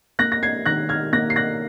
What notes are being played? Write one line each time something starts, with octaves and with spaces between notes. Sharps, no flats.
A#3 F#6 A#6
A#6
G#6 C7
D#3 F#6 A#6
F6 G#6
A#3 F#6 A#6
C7
F#6 A#6